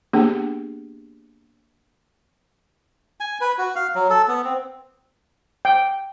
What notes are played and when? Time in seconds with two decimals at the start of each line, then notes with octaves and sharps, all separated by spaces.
0.13 A#3 B3 D4 G4 G#4
3.20 G#5
3.41 B4
3.58 F#4
3.76 F5
3.95 F#3
4.10 A4
4.28 B3
4.44 C4
5.65 G5